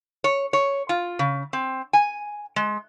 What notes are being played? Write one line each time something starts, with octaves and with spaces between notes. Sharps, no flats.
C#5
C#5
F4
C#3
C4
G#5
G#3